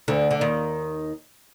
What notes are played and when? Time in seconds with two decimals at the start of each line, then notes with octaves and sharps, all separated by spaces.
0.08 D2 D3
0.31 D3
0.41 D#2 D#3